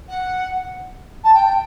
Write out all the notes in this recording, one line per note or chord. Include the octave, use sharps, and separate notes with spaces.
F#5
A5
G5